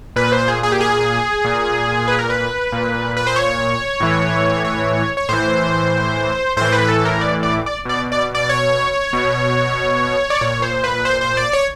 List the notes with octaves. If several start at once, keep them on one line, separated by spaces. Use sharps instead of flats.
A#2 B4
C5
G#4
G#4
G4
G#4
A#2
B4
A#4
B4
A#2
B4
C5
C#5
A2 E3
C#5
C#5
A2 E3 C5
A2 E3 C5
B4
A4
A#4
D5
D5
D5
B2 D5
D5
D5
C#5
B2
D5
A#2 C#5
C5
B4
C5
C5
D5
C#5